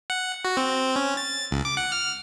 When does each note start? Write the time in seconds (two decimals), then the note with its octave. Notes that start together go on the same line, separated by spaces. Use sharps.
0.10 F#5
0.45 F#4
0.57 C4
0.96 C#4
1.17 A6
1.51 C#2
1.65 D6
1.77 F#5
1.92 F6